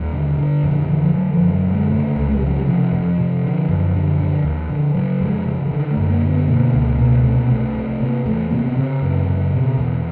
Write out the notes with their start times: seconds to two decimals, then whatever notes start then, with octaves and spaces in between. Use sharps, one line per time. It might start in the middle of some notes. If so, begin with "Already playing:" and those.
Already playing: D#2 G3
0.13 D3
0.37 D3
0.63 F2
0.71 D3
0.82 D#3
0.89 D3 E3
1.04 F3
1.14 D3 F#3
1.33 F3
1.40 F#2
1.52 F#3
1.65 D3
1.71 G#3
1.91 C#3 A3
2.16 C#2
2.29 G#3
2.37 G3
2.41 C#3
2.47 F#3
2.55 G3
2.66 C3 F3
2.92 F2
3.18 C3
3.43 D3
3.69 F#2
3.94 D3
4.19 D3
4.44 D#2
4.69 D3
4.95 C#3 F#3
5.21 F2 G#3
5.46 C#3
5.65 E3
5.71 D3 D#3
5.91 A3
5.97 F#2
6.10 A#3
6.22 D3
6.29 B3
6.47 B2 A#3
6.72 C#2 A#3
6.98 B2 A#3
7.24 C3 A3
7.36 A#3
7.49 C2 A3
7.75 C3
8.00 C3 A#3
8.25 E2 A3
8.50 C3 A#3
8.66 B3
8.76 C#3 C4
9.02 F#2
9.27 C#3
9.52 B2
9.77 E2